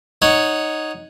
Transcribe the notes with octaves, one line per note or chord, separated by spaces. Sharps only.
D#4 C#5 F#5